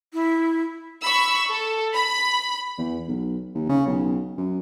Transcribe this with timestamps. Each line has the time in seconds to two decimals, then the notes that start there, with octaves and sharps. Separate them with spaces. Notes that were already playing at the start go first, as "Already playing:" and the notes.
0.13 E4
1.03 B5 C#6 E6
1.50 A4
1.95 B5
2.78 E2
3.08 B1
3.55 D#2
3.69 C#3
3.86 B1
4.38 F#2